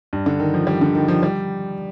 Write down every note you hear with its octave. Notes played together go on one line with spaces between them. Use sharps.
G2
D3
D#3
F3
G3
D3
D#3
F3
G3